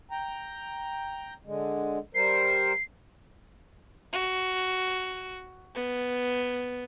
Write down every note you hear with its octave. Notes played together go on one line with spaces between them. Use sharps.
G5 A#5
D3 G#3
G3 A#4 C5 C7
F#4
B3